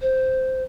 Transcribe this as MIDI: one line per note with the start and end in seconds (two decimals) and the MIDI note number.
0.01 0.63 72